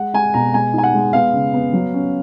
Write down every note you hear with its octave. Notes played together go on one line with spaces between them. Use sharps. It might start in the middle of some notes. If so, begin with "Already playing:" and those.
Already playing: G#3 F#5
G#3 G#5
B2 A#5
G#3 G#5
D#4 G#5
F#5
G#3
B3 F5
C#3
B3
F#3
C#4